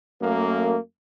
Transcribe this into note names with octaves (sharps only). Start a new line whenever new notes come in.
F#2 A3 A#3